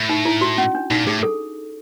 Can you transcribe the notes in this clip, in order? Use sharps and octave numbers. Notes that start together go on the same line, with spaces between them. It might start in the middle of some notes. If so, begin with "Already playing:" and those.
Already playing: A2
D#4
E4
F#4
C#4
D4
A#2 D#4
A2 G#4
A4